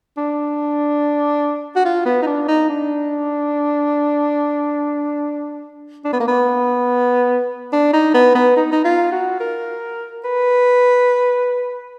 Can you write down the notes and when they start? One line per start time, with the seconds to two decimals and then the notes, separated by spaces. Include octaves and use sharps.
0.17 D4
1.76 F#4
1.85 F4
2.06 B3
2.22 D#4
2.27 D4
2.48 D#4
2.69 D4
6.05 D4
6.13 B3
6.20 A#3
6.28 B3
7.72 D4
7.93 D#4
8.14 B3
8.35 B3
8.56 D#4
8.72 D#4
8.85 F4
9.12 F#4
9.40 A#4
10.24 B4